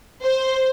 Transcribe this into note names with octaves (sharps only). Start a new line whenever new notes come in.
C5